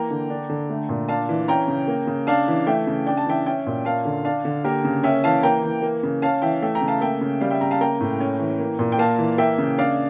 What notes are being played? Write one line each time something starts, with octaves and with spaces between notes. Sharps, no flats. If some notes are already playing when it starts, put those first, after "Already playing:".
Already playing: E3 A#3 G5 A#5
D3
D4
D3
A3
A#2
D4 F5 A5
E3
C#4 G5 A#5
C#3
A#3
C#3
D4 F5 A5
E3
A3 E5 G5
C#3
D4 G5
A5
E3 E5 G5
C#4 E5 G5
A#2
A#3 F5 A5
D3
D4 F5 A5
D3
A#3 G4 A#4
C#3
C#4 E5 G5
E3 F5 A5
A#3 G5 A#5
E3
A#3
C#3
C#4 F5 A5
E3 E5 G5
A3 E5 G5
G5 A#5
C#3
F5 A5
A#3 E5 G5
C#3
G3 D5 F5
E5 G5
C#3 G5 A#5
F5 A5
A#3 G5 A#5
A2
C#4
E3
A#3
A#2
G5
A#3 F5 A5
E3
A#3 E5 G5
C#3
D4 D5 F5